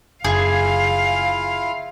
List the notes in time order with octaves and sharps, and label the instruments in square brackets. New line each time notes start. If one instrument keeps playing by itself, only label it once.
[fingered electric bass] F#1 [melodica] E4 F4 [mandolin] G#4 [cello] F5